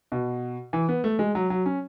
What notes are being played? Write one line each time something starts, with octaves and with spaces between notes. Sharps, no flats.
B2
E3
B3
A3
G#3
F#3
F#3
C#4